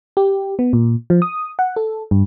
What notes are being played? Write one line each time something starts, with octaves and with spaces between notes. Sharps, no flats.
G4
B3
A#2
F3
D#6
F#5
A4
G2